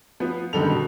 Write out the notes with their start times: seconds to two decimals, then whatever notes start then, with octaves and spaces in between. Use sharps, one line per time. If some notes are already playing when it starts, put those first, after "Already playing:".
0.20 F3 B3
0.53 F#1 D3 D#3 G3 A4 F7
0.69 B2